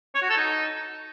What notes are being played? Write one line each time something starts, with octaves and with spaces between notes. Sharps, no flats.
C#5
F#4
A4
D#4